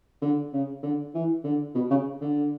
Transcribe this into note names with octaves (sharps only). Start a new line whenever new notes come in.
D3
C#3
D3
E3
D3
B2
C#3
D3